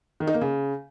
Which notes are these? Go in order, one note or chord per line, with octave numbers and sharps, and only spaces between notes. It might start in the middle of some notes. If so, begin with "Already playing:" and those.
D#3
D#4
A#3
C#3